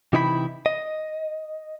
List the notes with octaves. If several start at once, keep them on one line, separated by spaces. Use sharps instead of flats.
C3 E3 D#4 E4 G5 B5
D#5